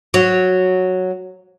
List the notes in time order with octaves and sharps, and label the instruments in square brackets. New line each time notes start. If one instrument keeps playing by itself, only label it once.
[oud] F#3